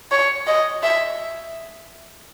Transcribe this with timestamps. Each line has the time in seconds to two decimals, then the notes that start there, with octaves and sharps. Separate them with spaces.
0.12 C#5
0.47 D#5
0.83 E5